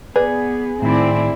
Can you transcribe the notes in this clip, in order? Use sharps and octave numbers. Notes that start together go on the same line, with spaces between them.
B3 G#4 B4 D5
A2 D#3 C4 E4 D5